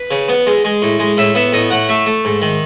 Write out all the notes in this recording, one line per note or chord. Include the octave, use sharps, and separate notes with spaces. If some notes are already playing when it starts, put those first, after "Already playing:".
Already playing: B4
C#3
B3
G#3
G#3
A2
G#3
A2 E5
B3 E5
A2 D#5
A2 F#5
A3 E5
A3
G#2
D#3